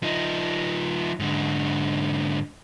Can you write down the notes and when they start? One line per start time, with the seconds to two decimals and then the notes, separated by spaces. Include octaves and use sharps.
0.03 F3 D#4
1.20 G#2 D3